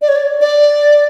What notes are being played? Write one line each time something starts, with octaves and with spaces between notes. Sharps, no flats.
D5
C#5
D5
D5